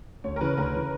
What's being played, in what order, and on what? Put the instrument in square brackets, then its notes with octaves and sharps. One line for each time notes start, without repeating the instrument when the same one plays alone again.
[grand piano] D2 [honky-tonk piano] C#5
[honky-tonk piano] A#4
[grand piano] C#3 E3 [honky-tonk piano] B4
[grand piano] D2 [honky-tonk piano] A#4
[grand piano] C#3 E3